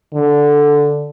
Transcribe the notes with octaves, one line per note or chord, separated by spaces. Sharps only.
D3